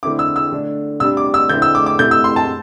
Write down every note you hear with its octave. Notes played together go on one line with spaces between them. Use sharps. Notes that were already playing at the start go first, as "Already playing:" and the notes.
D3 A3 C4 E4 D6
E6
E6
D3 A3 D4
C3 G3 D4 E6
D6
E6
D3 C4 E4 G6
E6
D6
D6
C3 A3 E4 G6
E6
C6
A5